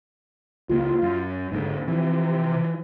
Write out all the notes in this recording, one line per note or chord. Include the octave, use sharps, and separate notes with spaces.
C#2 G#3 A#3 F4
F#2
G#1 D#2 G#2 D3
C3 E3 F3